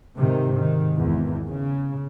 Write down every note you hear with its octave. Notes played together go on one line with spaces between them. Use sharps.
G#2 C3 D#3
G#2 D#3
G#1 E2
C#3